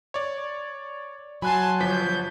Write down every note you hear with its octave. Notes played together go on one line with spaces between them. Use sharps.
C#5 D5
F#3 G#5 A5 B5 C6 F#6
G1 F3 G6 B6